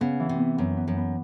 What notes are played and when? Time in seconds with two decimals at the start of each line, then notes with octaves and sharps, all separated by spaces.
0.01 C#3 B3
0.20 E3
0.29 C3
0.39 B3
0.58 F#2 B3
0.77 B3
0.87 F#2
0.96 B3